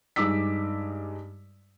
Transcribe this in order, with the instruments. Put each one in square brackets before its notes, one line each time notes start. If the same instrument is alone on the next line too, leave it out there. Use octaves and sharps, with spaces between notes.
[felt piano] G2 G#3 D#4 D6 E6 B6